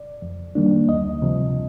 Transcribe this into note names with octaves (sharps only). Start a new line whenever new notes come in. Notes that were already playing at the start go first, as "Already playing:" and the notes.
Already playing: D5
F2
D#3 G3 A#3 D4
D2 D#5
C3 F3